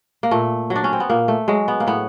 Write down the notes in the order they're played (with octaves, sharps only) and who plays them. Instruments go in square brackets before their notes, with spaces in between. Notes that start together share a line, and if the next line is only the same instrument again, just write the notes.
[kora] A#3
A#2 A3
F#3
D4
C#4
C4
B3
A#2 A#3
A3
F#3 G#3
B3
A#3
A2 B3